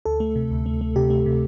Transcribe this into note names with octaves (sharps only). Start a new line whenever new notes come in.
D2 A4
A3
C3
D2
A3
A3
C3 G4
A3
C3